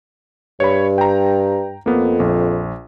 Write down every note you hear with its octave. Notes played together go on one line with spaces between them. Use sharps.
G2 C#5 B5
G5 A#5
F2 A#3 B3
A#1